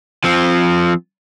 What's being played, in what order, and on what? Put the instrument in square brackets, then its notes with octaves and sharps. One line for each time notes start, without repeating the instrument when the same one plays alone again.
[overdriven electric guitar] F3 C4